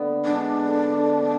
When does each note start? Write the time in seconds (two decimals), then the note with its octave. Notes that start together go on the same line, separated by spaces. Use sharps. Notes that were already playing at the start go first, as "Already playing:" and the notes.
Already playing: D3 B3
0.24 G#3 D4
0.58 D3
0.89 D3
1.22 B3